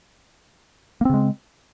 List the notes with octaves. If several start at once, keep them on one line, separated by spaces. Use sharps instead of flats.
C#3 G#3 A#3 C4